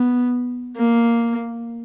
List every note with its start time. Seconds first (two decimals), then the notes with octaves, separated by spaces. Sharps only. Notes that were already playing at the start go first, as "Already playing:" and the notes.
Already playing: B3
0.76 A#3